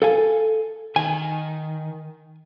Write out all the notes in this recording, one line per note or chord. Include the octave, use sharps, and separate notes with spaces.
A4 F5 G#5
D#3 G#5